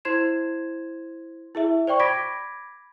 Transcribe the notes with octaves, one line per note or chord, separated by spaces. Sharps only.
E4 C5 C6 G#6 C7 E7
E4 G#4 E5
C5 D5 G5 C#6
B5 D6 G#6 A#6 B6 D7